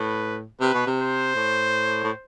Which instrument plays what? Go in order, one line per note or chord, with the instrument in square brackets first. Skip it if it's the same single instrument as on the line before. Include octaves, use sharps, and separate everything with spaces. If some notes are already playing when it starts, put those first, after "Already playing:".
Already playing: [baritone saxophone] A2 [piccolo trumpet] B4
[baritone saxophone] C3 [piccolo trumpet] B4
[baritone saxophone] B2
C3
[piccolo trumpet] C5
[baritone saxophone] A2
A2